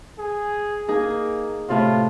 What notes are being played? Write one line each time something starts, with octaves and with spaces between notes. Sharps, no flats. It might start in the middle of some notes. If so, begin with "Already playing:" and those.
G#4
A#3 D#4 G#4
A2 C3 F4